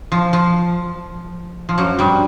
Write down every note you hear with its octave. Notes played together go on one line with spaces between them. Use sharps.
F3
F3
F3
F#2 F#3
G2 G3